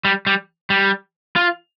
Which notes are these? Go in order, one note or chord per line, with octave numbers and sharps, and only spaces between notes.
G3
G3
G3
F4